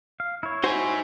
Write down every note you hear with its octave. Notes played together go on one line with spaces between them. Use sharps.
F5
E4 C#5
D#4 F#4 C5 G#5